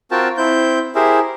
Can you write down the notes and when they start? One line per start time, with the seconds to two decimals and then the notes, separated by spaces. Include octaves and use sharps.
0.11 C4 F4 F#4 A#4 G5 A5
0.37 C4 E4 G6
0.95 E4 G4 G#4 A#4 C5 E5